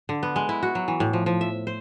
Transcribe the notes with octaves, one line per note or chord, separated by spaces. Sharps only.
D3
B3
G#3
E4
F#4
F#3
E3
A2
F3
F3
E5
C5